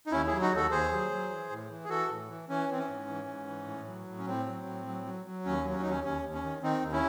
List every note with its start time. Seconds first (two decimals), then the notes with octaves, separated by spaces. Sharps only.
0.07 D#4
0.12 D#2 C#4 E4
0.27 F#3 E4 G#4
0.42 D#4 F#4
0.52 D#2 F#4 A4
0.71 D#2 G#4 C5
0.92 F#3
1.11 F#3
1.30 E3
1.50 A2
1.70 E3
1.84 G#4
1.89 E3 F#4 A4
2.10 A2
2.29 E3
2.49 E3 C#4
2.69 E3 C4
2.79 C#4
2.88 G#2
3.08 E3
3.28 G#2
3.47 E3
3.67 A2
3.87 F#3
4.07 A2
4.18 C#4
4.27 A2 C4
4.46 F#3
4.66 A2
4.85 F#3
5.06 F#3
5.26 F#3
5.45 D#2 C#4
5.65 F#3
5.74 C#4
5.82 D#2 D#4
5.90 C#4
6.04 D#2 C#4
6.24 D#2
6.34 C#4
6.43 D#3
6.63 D#3 C4 D#4
6.83 D#2
6.92 C#4 E4